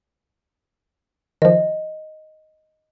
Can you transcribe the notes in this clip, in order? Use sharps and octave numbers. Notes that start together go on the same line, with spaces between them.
D#3 F3 D#5